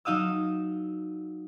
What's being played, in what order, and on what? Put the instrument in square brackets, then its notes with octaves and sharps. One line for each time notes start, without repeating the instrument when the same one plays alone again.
[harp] F#3 D#4 F5 D#6 E6